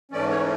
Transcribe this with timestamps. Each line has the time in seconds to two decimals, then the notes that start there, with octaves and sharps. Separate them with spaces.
0.11 G#2 E3 A3 C#4 D5
0.29 C#5